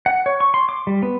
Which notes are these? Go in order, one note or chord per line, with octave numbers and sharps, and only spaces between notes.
F#5
C#5
C#6
C6
D6
G3
B3